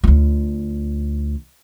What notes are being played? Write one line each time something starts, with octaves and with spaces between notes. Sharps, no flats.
D2 F4